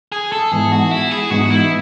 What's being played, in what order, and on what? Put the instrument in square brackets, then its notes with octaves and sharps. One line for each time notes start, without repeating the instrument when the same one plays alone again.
[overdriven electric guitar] G#4
A4
[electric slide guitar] G#2 E3 B3 D#4 [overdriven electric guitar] G#4
[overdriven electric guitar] F#4
E4
G#4
[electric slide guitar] G#2 E3 B3 D#4 [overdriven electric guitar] F#4
[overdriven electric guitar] E4